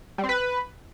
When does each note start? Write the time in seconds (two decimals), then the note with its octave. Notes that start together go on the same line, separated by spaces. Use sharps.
0.18 G3
0.24 C4
0.29 B4